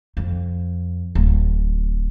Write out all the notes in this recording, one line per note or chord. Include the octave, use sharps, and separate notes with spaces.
F2
D1